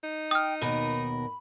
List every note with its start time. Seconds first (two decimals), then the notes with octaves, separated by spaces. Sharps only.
0.04 D#4
0.31 G5 D#6 F6
0.62 D#2 B2 A#4 B5